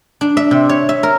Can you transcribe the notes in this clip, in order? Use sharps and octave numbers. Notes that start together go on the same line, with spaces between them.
D4
E5
C3
C#5
E5
A#4